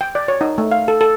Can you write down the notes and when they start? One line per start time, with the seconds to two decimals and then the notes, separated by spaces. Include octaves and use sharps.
0.01 G5
0.15 D5
0.28 C#5
0.41 D#4
0.58 A3
0.71 F5
0.88 A4
1.01 A4